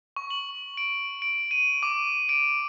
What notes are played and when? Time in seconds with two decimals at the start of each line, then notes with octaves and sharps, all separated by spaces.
0.16 C#6
0.30 F#7
0.77 D7
1.22 D7
1.51 D#7
1.83 D6
2.29 D7